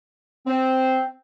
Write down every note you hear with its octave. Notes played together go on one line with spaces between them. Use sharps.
C4